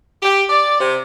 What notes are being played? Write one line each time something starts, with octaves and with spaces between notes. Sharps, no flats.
G4
D5
C3